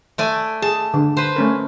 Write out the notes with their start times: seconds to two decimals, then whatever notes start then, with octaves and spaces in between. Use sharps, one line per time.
0.18 A3 D5 G#5
0.62 G#4 A5
0.94 D3
1.17 B4 C5
1.36 A3 C#4 A#4